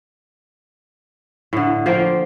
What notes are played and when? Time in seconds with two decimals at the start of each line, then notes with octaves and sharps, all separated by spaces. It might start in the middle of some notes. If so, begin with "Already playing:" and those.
1.53 A2 D3
1.86 F3 A#3 C5 G5